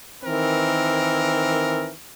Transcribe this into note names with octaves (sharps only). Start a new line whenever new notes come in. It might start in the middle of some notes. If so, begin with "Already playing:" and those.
D#3 E3 C4 A#4